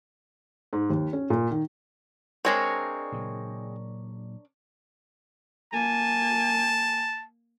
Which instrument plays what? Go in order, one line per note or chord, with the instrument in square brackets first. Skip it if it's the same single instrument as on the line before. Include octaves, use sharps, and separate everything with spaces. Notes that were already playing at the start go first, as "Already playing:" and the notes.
[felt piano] G#2
D#2
C#4
A#2
D#3
[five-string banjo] G#3 C4 [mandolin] D4 A#4 C#5
[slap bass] A#2 C#3 F#3
[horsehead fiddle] A#3 G#5 [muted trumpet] A5